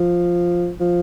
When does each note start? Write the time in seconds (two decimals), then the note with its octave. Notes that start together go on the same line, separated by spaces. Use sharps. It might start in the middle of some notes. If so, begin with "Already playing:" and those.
Already playing: F3
0.80 F3